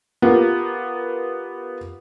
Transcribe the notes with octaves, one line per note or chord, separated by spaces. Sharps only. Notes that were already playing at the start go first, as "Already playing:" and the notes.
B3 F4 G4 A#4